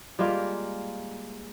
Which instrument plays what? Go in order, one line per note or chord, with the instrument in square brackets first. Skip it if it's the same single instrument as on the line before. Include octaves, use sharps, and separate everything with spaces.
[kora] G3 G#3 A#3 F4